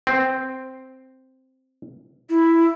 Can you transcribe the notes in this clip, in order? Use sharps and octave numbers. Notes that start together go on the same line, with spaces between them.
C4
E4